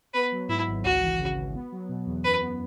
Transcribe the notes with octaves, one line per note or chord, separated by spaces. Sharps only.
B3 B4
F#3
G#2 E4
G#1
C#2 F#4
E3
C#3
C#2
B3
F#3
B2
E2
F#2 B4
B3